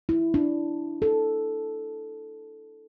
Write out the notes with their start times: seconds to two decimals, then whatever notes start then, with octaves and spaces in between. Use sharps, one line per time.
0.09 E4
0.34 D4
1.02 A4